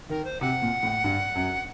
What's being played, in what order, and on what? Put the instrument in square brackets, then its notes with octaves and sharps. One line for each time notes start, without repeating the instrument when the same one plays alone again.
[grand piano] D#3 [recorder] A#4
[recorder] C5
[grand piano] C3 [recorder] F#5
[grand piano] A#2
A2
G2
F#2